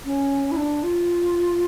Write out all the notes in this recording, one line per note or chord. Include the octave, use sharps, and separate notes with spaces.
C#4
E4
D4
F4